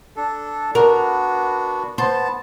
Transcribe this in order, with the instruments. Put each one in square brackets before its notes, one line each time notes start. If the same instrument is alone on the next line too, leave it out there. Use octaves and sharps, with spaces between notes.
[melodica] D4 A4
[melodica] B3 D4 F#4 [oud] A#4
[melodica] B3 A5 [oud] C5